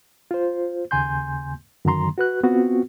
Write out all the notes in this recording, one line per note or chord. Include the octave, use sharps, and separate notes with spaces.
F4 C5
D#2 C#3 G#5 C6 G6
F#2 D3 D#3 F#3 A#5 C6
F#4 B4 F#6
B3 C4 F4 F#4